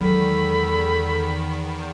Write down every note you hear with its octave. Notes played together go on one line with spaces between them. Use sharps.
E2 D#3 F#3 G#3 A4 B5